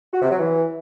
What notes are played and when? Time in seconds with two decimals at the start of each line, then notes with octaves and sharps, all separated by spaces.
0.13 F#4
0.22 C3
0.30 F#3
0.39 E3